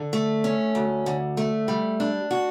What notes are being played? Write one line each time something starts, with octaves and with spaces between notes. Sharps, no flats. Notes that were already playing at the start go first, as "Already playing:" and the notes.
Already playing: D3
A3
C#4
D2
D3
A3
G3
D4
F#4